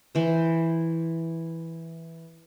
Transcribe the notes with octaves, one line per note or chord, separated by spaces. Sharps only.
E3 C5